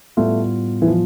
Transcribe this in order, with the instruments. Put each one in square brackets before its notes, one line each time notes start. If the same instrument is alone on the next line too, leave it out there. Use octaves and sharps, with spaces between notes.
[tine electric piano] A2 G3 B3 F4 [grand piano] A3
[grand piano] E3
F3